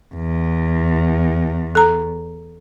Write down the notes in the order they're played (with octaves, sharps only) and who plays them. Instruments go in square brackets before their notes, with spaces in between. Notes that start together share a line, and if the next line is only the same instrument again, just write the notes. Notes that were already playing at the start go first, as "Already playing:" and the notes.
[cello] E2
[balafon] A4 A#5